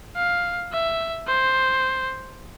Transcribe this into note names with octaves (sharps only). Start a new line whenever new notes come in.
F5
E5
C5